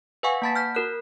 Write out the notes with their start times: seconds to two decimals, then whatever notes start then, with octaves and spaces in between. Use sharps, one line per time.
0.23 B4 D#5 F5 F#5 G#5 C#6
0.42 A#3 F#5 A5 B5 A6 B6
0.56 F6 G6 B6
0.75 F#4 A#4 F#6